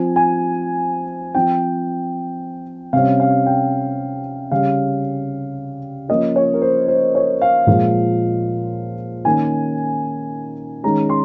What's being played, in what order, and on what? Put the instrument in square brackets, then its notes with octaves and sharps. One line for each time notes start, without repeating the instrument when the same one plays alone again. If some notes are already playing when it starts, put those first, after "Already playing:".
Already playing: [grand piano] F3 C4 G#5
G#5
F3 C4 G5
C3 G3 C#4 F5
F5
G5
C#3 G3 C#4 F5
F3 A#3 C#4 D#5
C#5
A#4
C5
C5
C#5
F5
A#2 F3 G#3
D#3 A#3 C#4 G#5
D#3 G#3 C#4 A#5
C6